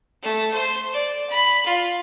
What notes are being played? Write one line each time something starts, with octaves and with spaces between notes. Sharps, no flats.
A3
C5
D5
B5
F4